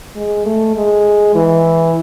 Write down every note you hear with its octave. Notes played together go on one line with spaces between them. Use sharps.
G#3
A3
G#3
E3